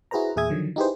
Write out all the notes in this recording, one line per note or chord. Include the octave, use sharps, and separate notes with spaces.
E4 F#4 G#4 B4 C5 A#5
E2 A#2 G#4 E5 D#6 G#6
D3 D#3 F3 F#3
D#4 E4 G4 G#4 B4 C5